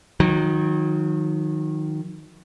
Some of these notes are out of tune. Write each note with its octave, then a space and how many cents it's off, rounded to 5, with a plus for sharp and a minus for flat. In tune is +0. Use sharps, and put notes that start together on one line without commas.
D#3 +0 F#3 -35